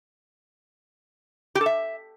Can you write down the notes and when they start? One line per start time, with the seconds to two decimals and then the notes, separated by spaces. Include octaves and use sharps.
1.55 G4
1.61 A4
1.66 E5